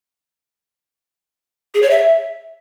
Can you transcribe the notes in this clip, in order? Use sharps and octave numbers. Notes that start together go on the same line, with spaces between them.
G#4
C#5
E5